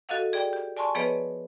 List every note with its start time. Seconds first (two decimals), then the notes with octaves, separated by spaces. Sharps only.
0.09 F#4 A4 D#5 F5 F#5
0.33 G#4 D5 G5
0.53 G4
0.77 D5 G#5 A5 C6 C#6
0.95 F3 B3 G#4 B4 C#5 D#5